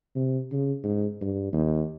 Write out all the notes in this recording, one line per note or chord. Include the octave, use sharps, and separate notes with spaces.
C3
C#3
G#2
G2
D#2